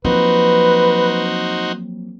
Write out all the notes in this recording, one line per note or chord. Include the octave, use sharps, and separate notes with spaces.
F3 F#3 A#3 C4 D#4 F#4 B4 C5